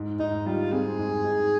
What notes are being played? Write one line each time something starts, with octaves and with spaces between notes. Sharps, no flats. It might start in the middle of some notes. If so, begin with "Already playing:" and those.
Already playing: G#2
G#2 D#4
G3 F4
C4 G#4
G#2
G#2